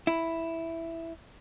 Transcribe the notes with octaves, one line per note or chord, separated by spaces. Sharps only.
E4